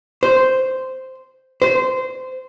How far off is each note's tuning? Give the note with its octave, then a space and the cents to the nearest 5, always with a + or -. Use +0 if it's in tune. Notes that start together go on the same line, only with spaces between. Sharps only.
C5 -5
C5 -20